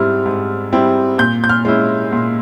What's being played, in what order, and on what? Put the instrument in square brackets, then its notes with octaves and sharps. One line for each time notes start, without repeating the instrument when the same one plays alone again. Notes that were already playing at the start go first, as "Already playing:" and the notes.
Already playing: [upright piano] G#2 G3 C4 E4 F6
G#2
G3 C4 E4
A#2 G6
G6
F6
G#3 C#4 E4
A#2